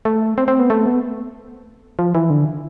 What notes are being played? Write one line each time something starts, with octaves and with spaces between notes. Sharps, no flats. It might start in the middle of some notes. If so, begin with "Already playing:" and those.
A3
C4
C4
B3
A3
B3
F3
E3
D3